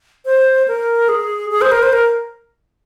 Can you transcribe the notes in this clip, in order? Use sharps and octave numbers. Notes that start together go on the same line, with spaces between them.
C5
A#4
G#4
G#4
C5
A#4
C5
A#4